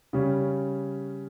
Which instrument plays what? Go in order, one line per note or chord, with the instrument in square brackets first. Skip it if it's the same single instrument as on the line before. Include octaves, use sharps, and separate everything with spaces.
[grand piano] C#3 G3 C#4